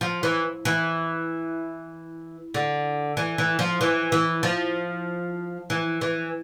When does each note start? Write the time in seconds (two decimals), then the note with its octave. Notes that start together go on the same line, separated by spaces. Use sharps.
0.01 F3
0.23 E3
0.65 E3
2.54 D3
3.17 E3
3.38 E3
3.59 F3
3.81 E3
4.12 E3
4.43 F3
5.70 E3
6.01 E3